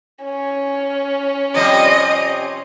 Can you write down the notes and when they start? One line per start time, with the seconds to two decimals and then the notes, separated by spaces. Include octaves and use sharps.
0.23 C#4
1.54 C3 F3 G3 D#5